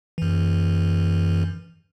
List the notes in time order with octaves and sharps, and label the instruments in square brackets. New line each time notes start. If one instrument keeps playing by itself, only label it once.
[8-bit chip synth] F#2 E3